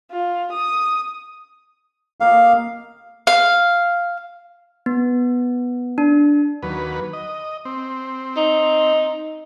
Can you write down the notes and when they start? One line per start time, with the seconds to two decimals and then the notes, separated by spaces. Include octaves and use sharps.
0.12 F4
0.53 D#6
2.20 A#3 G4 D#5 F5
3.27 F5
4.86 B3
5.98 D4
6.63 D#2 F#3 B4
7.13 D#5
7.65 C4
8.37 D#4